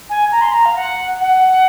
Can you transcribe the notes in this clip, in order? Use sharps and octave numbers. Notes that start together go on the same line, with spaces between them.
G#5
A#5
C6
A#5
F5
F#5
F#5